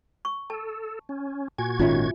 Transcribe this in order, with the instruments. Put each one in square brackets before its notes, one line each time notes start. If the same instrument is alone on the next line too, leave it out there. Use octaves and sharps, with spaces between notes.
[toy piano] C#6
[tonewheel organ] A4 [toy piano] A5
[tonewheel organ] C#4
[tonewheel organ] A#2 F#4 G#6 [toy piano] G#5
[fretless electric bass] G#1 D#3 C#4 [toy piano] F4 E5